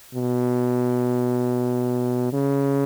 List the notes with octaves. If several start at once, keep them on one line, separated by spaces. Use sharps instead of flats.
B2
C#3